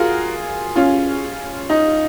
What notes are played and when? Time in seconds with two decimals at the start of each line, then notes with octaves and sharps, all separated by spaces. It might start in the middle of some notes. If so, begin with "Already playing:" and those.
Already playing: F4 F#4 G#4 A#4
0.76 C#4 F4
1.70 D#4